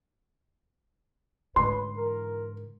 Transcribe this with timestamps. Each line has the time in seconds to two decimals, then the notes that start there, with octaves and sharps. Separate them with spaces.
1.56 G#2 D3 C#4 B4 C6
1.97 E3 A#4